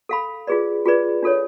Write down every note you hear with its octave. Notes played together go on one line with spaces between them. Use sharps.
A4 F5 B5
F4 G#4 B4 D5
F4 G#4 B4 D5
D4 F4 A4 C#5